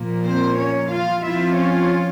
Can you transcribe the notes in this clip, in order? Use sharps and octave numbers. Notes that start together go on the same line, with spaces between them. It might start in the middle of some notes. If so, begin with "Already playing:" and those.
Already playing: A#2 F3 A#3
C4 C5
C#4 C#5
F4 F5
F3 C4 E4 F4 E5
C#4 C#5